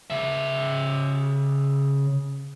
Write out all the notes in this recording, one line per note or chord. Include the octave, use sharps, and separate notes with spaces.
C#3 E5